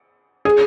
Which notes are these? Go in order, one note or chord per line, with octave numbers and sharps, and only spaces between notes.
G#4